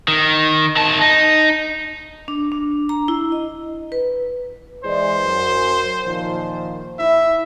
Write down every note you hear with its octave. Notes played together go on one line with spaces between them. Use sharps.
D#3
D#3 A5
D#4
D4
D4
A#5
E4
D#5
B4
E3 G#3 C5 D5
F#2
A#2 D#3 F3
E4 E5